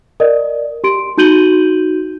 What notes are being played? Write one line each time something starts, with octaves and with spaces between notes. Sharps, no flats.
A#4 D5 D#5
G4 C6 D7
D#4 F#4 G6 D#7 F#7 G7